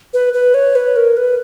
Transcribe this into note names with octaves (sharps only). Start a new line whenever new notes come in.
B4
B4
C#5
B4
A#4
B4